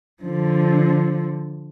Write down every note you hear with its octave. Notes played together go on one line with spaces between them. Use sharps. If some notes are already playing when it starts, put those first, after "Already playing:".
D3 F3